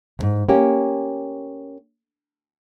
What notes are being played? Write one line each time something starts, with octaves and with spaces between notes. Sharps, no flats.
D2 G#2
A#3 C#4 G4